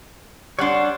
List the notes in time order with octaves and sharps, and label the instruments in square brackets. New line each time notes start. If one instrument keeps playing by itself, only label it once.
[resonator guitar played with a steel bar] G3 D4 [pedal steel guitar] C#5 F#5 C6